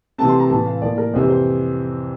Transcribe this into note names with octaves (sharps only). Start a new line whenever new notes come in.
C3 E3 A3 C4 A5
C6
A#5
A2 E3 A3 A5
F5
A2 F3 A#3 D5
A#4
F2 C3 E3 C5
C5